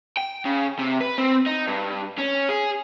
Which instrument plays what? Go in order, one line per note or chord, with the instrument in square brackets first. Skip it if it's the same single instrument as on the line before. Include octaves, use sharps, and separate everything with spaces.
[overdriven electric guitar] G5
C#3
C3
B4
C4
D#4
G2
C#4
G#4